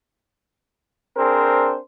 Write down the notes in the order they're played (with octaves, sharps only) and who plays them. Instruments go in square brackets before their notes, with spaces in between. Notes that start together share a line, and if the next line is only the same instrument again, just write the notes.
[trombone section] C4 D4 G#4 A#4 C5